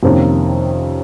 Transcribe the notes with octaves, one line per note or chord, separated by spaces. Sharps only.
F2 C3 D#3 A#3 C#4